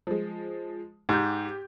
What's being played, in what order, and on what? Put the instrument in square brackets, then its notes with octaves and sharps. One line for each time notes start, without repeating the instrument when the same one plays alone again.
[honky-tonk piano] F3 G#3
[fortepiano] G#2 [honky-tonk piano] G4 G6